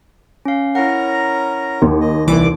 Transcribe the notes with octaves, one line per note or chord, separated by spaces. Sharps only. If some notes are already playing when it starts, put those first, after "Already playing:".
C#4 F5
C#4 E4 A#4 F#5 A#5
D#2
D#5
C2 E3 D5 D6